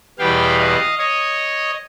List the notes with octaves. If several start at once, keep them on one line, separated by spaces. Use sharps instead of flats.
E2 B2 G3 B3 F5 G5
D#5 F5
C#5 D#5